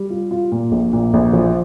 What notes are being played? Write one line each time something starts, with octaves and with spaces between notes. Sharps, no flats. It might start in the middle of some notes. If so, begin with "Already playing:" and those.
Already playing: G3
F4
F4
A#2
A#1
A#2
A#1
F3